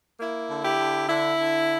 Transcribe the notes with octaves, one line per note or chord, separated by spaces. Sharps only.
A#3 E4
D3
E4 G4
D3
D3 E4
D3